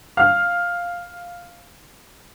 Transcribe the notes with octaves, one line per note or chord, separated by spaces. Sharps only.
F5 F6